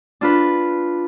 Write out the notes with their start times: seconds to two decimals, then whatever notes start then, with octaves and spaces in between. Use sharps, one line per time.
0.21 D4 F4 B4